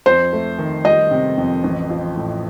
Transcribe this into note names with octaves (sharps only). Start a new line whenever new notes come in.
F2 C5
A3
D#3
G3 D#5
C3
F2
A1
F3
A2